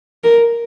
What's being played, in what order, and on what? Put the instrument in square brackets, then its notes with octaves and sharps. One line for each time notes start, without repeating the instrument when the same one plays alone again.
[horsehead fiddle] A#4